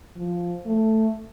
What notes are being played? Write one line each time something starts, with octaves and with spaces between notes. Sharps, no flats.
F3
A3